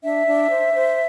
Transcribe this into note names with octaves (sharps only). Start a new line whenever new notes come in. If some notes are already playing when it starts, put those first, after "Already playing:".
D4 E5
D4
C5
C5